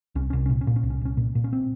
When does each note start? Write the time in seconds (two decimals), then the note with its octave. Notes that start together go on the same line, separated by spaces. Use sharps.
0.15 C2 C#4
0.30 C#4
0.33 C2
0.46 C#4
0.50 A#2
0.61 C#4
0.67 A#2
0.76 C#4
0.83 C2
0.90 C#4
1.01 C2 C#4
1.17 A#2
1.35 A#2
1.44 C#4
1.53 C4